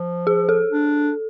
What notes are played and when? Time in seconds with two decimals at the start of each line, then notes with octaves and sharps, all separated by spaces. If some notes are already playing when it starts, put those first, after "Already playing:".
Already playing: F3
0.27 G#4
0.49 A4
0.71 D4